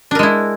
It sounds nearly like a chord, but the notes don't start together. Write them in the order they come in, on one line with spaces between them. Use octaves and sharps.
D4 A#4 G#3 E4